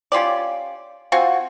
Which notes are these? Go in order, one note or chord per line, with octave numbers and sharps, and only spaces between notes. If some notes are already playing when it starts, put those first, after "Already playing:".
C#4 F4 G4 D5
C4 F4 F#4 G#5